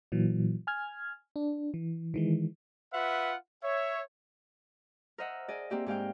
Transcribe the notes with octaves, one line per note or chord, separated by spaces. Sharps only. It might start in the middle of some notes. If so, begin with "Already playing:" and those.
A#2 E3 F#3
G#5 F6 G#6
D4
E3
D#3 E3 G#3
F4 B4 E5 F#5
C#5 E5
A#4 C5 D#5 E5 F#5
G#4 D5 D#5
A#3 C4 G4 E5
G#2 G4 F5 G5